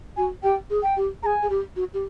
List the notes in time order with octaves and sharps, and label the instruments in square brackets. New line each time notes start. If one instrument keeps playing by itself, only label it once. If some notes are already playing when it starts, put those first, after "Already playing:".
[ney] F#4 [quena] G#5
[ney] G4 [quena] G5
[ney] G#4
[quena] G5
[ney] G4
[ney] G#4 [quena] G#5 A#5
[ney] G#4
G4
F#4
G4